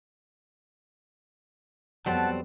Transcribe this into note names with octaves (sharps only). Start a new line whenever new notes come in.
F2 F#3 G3 B3 C4 F#5 A5